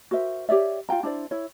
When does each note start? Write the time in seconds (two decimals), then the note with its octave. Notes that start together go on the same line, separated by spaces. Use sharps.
0.11 F#4 A#4 C5 E5
0.49 G4 C#5 D5 E5
0.89 F4 F5 G5 A#5
1.03 D4 E4 C5 D5
1.31 E4 C#5